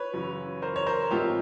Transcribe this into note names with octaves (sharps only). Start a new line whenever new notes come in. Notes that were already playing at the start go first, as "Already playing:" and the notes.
Already playing: B4 C#5
F#2 C#3 E3
A#4 C5
C#5
A#4 C5
A1 G#2 F3 A3 C4 F4 G4